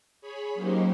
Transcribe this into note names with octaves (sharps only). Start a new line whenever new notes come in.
G#4 C#5 B5
F#3 A#3 C#4 D#4 G4 C5